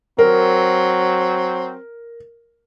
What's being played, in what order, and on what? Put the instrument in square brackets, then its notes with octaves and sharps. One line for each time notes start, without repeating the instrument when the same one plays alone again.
[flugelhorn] F#3 [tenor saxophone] C4 [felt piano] A#4